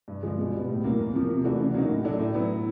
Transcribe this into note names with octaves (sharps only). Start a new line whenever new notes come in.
G2
D3 F3 G#3
B2
G3 B3
A2
F#3 A#3
E2
C3 F3 A#3
C3
E3 A3 D4 F#4
C#3
F#3 A#3 D#4 F#4
A2
F#3 A3 D4
A2
F#3 B3 E4